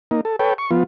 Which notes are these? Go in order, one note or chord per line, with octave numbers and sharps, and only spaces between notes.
A#3 D#4
A4
A4 B4 C#5 G5
C#6
F3 B3 F4